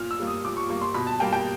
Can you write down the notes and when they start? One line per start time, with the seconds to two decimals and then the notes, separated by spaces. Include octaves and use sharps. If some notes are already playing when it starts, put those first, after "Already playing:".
Already playing: A#2 F6
0.11 E6
0.20 G3 A#3
0.27 D#6
0.44 A#2 D6
0.57 C#6
0.69 G3 A#3 C#6
0.81 C6
0.94 B2 B5
1.07 A5
1.20 G3 A#3 G5
1.33 G5